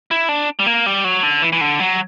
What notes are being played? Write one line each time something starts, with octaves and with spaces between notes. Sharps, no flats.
E4
D4
G3
A#3
G3
F#3
D3
E3
E3
D3
F#3